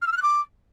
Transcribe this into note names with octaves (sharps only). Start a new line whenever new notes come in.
F6
E6
F6
F#6
D6